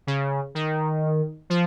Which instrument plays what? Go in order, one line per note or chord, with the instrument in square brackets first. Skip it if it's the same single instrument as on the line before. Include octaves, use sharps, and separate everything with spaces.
[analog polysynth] C#3
D#3
F3